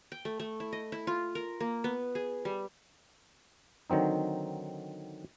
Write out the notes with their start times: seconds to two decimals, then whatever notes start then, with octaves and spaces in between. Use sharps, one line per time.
0.12 G5
0.25 A3
0.40 A3
0.60 E4
0.72 D#5
0.92 E4
1.07 F4
1.35 A#4
1.60 A#3
1.84 B3
2.15 G#4
2.45 G3
3.90 D3 D#3 F#3 C4 D#4